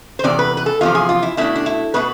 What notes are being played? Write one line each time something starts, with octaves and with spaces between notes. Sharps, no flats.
C5
E2 C3 D5
B4
B4
A4
E2 C3 F3 F4
G#4
F4
E4
B2 A3 D4 E4
D4
E4
B2 A3 B4